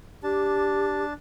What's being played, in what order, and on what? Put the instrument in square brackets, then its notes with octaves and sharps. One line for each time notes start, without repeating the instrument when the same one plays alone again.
[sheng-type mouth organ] D4 A5 [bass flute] G4